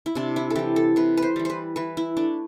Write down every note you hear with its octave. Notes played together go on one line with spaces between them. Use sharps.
E4
C3 D4
E4
A4
E3 G3 G4
A4
C3 B4
B4
C5
E3 G3
B4 C5
E3 B4
E4
A3 D4